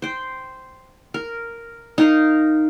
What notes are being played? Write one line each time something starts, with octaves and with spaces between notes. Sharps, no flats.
C5 G5
A#4
D#4 A#4 F5